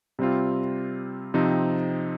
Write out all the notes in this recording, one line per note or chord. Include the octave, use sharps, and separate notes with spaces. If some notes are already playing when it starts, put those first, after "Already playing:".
C3 G3 C4 F4
C3 F3 C4 D#4